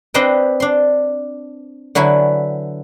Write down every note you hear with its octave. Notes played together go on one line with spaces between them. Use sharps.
C4 D4 B4 C5 D#5 G5
D4 C6
D3 F#3 E4 B4 G#5